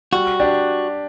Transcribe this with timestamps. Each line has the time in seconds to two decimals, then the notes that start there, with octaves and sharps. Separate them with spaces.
0.13 G3 F#4
0.40 D4 G4